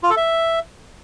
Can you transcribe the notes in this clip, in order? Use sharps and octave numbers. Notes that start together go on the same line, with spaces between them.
F4
A4
E5